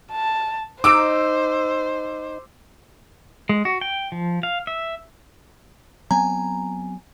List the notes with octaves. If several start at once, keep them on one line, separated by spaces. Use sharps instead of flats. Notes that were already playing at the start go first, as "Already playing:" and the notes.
A5
D#4 C5 D6 E6 D7
G#3
F#4
G5
F3
F5
E5
F#3 B3 C4 G#5 A#5